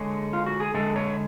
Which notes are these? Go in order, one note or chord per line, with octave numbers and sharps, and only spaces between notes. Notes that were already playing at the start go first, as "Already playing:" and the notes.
Already playing: D3 G#3 C#5
F4
F#4
G#4
D3 G#3 A4
C#5